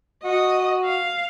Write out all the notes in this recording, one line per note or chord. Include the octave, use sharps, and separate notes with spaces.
F#4 D#5
F5